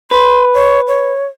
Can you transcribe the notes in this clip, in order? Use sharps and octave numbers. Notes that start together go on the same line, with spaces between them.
B4 C6
C#5
C#5